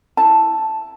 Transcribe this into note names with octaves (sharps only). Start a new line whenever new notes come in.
E4 A5